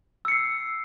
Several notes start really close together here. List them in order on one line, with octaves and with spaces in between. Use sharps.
E6 C#7 C7